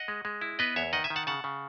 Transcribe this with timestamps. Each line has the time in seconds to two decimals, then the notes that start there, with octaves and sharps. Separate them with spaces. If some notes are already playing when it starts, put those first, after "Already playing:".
Already playing: D#5 F#5
0.08 G#3
0.25 G#3
0.41 E4
0.59 B3 B4 D#5
0.76 E2 C#5 E5
0.93 D#3 D#5 F#5
1.04 E5 G#5
1.10 D#3
1.16 F#5 A5
1.27 C#3 F#5 A5
1.44 C#3